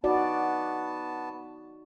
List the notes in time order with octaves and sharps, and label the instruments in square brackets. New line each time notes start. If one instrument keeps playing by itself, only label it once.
[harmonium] B3 A5 [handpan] D#4 F#4 D5